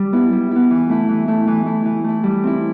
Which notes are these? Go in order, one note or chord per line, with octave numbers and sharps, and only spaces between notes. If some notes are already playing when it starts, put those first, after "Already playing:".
Already playing: G3
B3 E4
G3
B3 E4
E3
A3 E4
E3
A3 E4
E3
A3 E4
E3
A3 E4
G3
C4 E4